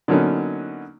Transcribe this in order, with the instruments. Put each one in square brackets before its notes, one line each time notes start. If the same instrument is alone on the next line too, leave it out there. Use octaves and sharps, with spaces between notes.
[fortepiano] D3 F#3 A#3 B3 C#4 D#4